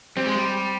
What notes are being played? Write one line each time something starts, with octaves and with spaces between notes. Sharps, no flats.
G3 C4
G#3
G3